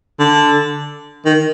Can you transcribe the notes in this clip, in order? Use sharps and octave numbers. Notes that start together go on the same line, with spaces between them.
D3
D#3